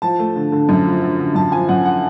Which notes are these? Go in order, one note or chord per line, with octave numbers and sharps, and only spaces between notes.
F3 A5
A3
D3
D3
F#2
F3
D3
D3
F#2 A5
F3 G#5
F#2 F#5
F#5